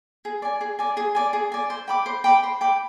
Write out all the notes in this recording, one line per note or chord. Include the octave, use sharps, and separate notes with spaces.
G#4
D5 G#5
G#4
D5 G#5
G#4
D5 G#5
G#4
D5 G#5
C5
G5 B5 D6
C5
G5 B5 D6
C5
G5 B5 D6